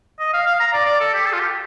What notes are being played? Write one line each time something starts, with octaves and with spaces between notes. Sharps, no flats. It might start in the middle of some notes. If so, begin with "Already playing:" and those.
D#5
F5
F5
A#5
D5
D5
A4
G4
A4
F4
G4